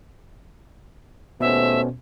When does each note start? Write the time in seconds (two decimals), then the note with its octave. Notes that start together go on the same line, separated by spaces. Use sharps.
1.40 D#2 B2 A3 B3 C#4 C5 E5